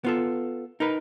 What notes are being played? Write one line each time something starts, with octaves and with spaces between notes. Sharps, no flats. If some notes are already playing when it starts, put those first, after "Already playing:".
B3 F4 A4
D#4 A#4 B4